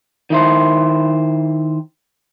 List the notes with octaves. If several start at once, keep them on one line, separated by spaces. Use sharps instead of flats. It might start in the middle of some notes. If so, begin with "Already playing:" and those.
D#3 E4 C5